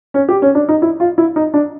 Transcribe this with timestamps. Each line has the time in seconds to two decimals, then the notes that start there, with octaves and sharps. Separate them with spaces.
0.14 C#4
0.29 G4
0.42 C#4
0.55 D4
0.69 D#4
0.82 E4
1.00 F4
1.18 E4
1.36 D#4
1.54 D4